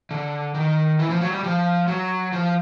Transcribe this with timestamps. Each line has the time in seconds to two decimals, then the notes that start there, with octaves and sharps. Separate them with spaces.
0.11 D3
0.54 D#3
0.99 E3
1.10 F3
1.21 F#3
1.32 G3
1.44 F3
1.87 F#3
2.32 F3